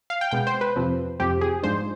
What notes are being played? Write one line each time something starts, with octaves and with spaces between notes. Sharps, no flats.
F5
G5
B2 G#3 B3 G5
C5
B4
F2 C3 F3 C4
F2 C3 F3 C4 G4
G#4
G#2 F3 G#3 D4 C5